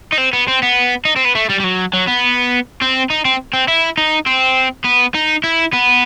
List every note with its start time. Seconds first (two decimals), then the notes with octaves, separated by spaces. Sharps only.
0.12 D#4
0.18 C4
0.33 B3
0.48 C4
0.63 B3
1.05 D#4
1.16 C4
1.25 B3
1.35 A3
1.50 G3
1.60 G3
1.64 F#3
1.94 F#3
2.08 B3
2.81 C4
3.10 D#4
3.25 C4
3.53 C4
3.68 E4
3.98 D#4
4.27 C4
4.85 B3
5.15 D#4
5.44 E4
5.73 B3